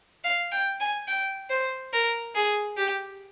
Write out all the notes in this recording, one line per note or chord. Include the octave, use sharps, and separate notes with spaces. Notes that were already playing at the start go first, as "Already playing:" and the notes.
F5
G5
G#5
G5
C5
A#4
G#4
G4